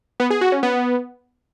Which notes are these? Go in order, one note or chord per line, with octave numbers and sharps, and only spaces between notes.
B3
G#4
F#4
C#4
B3